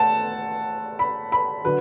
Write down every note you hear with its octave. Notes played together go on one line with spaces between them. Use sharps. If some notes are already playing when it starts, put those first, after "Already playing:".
Already playing: A3 F#5 A5
B5
B5
D3 F#3 B4